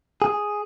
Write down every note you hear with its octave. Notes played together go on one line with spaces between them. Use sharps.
G#4